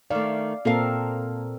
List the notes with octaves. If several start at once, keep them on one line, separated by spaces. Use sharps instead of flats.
D#3 A3 D5 F5
A#2 A#3 C4 A4 A#4 F5